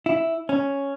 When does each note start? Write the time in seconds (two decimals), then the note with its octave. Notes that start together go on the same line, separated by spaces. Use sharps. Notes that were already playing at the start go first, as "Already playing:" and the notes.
0.06 E4
0.49 C#4